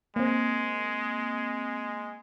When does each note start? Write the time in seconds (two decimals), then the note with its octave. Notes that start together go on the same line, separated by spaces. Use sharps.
0.16 G#3 A#3 C4